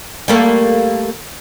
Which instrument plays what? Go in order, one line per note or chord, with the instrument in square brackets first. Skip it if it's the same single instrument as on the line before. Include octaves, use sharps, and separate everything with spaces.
[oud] G3 A3 A#3